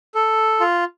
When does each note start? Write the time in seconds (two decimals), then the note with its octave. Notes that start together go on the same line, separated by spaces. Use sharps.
0.15 A4
0.60 F4